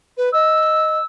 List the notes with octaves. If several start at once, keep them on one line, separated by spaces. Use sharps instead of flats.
B4
D#5 E6